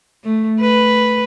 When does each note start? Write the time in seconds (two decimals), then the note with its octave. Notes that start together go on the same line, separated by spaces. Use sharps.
0.24 A3
0.60 B4